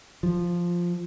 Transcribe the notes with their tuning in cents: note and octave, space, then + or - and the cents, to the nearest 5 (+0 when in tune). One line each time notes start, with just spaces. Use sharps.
F3 +0